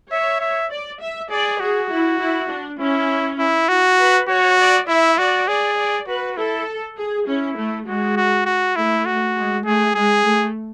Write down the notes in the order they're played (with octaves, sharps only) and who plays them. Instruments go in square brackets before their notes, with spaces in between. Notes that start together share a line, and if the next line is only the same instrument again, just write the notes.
[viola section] C#5 [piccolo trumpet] E5
[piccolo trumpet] E5
[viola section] D5
E5
[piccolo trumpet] G#4 [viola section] D5
[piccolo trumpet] F#4 [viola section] G#4
[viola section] E4
E4
D4
[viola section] C#4 [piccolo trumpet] E4
[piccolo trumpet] E4
[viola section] E4 [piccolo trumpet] F#4
[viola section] B4
[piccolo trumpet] F#4 [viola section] C#5
[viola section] D5
[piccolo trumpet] E4 [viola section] E5
[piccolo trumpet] F#4 [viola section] D5
[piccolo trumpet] G#4 [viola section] D5
[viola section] D5
[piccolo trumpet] F#4 [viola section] B4
[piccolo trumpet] E4 [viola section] A4
[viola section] G#4
[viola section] C#4 [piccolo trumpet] E4
[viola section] A3
[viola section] G#3 [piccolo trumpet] F#4
[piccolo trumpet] F#4
F#4
[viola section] A3 [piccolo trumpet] E4
[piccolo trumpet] F#4
[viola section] G#3
[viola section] A3 [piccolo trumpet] G#4
[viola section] G#3 [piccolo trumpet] G#4
[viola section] A3